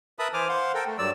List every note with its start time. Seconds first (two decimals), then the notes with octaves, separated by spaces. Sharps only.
0.19 A#4 B4 E5 A5 B5 D#6
0.34 E3 C5 G#5 D6 F6
0.48 C5 F5 F#5 C6
0.75 A4 A#4 G5
0.87 A3
0.98 G2 F#3 D5 E6